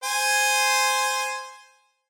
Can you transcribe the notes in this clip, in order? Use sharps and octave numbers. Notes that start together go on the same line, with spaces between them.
C5 G#5